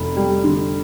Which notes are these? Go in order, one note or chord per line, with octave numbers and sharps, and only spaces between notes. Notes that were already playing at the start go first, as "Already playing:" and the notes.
Already playing: F1
G3
D3